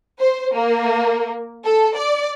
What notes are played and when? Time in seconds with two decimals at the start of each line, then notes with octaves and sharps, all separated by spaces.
0.19 C5
0.54 A#3
1.64 A4
1.96 D5